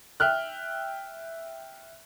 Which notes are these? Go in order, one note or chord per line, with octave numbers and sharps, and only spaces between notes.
E5 G5 F6 F#6